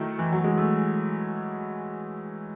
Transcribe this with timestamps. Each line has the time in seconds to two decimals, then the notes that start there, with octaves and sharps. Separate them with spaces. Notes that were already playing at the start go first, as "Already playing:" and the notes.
Already playing: D#3 F#3 A3 E4
0.19 E3
0.32 F#3
0.44 G#3
0.58 A3